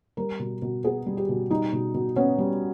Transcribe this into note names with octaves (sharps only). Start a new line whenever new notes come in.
G3 A#4
B2
B2
B3 G#4
G3
G4
B2
G3 D#4
B2
B2
B3 C#4
G3